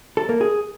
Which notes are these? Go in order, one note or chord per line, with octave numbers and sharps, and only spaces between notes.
A4
A#3
G#4